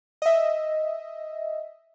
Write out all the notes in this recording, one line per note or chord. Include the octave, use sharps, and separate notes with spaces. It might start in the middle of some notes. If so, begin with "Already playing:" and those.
D#5 E5